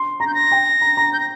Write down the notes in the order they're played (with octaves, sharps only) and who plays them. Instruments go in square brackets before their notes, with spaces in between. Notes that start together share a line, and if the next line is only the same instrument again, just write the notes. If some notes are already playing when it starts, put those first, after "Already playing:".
Already playing: [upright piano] C6
[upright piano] A#5 [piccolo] A#6
[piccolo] G6
A#6
[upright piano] G5
A#5
A#5
[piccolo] G6
A#6